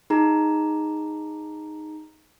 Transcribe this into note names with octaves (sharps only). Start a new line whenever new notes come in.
D#4 G#4 A#5